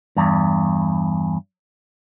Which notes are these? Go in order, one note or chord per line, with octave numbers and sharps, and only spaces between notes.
E2 G2